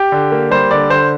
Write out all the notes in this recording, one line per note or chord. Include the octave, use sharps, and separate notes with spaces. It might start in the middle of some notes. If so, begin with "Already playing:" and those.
Already playing: G4
D3
A#3
G3 C5
D3 D5
D3 C5